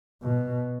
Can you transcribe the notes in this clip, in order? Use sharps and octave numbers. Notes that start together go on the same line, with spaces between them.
B2